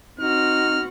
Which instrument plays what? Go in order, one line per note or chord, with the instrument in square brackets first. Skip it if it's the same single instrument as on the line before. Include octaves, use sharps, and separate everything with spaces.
[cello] C4 F#4 [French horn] D#4 [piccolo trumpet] F6